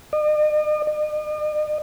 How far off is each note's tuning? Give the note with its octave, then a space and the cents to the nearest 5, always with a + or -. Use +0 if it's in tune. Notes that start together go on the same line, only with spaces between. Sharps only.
D#5 -45
D#5 -45